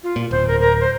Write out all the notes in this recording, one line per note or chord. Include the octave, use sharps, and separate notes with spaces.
F4
A#2
D1 C5
A#4
A#4
C5